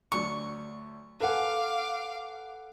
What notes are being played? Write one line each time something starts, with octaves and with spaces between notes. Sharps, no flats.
D2 F#3 D4 C#6
A4 B4 F5 F#5 G#5 D6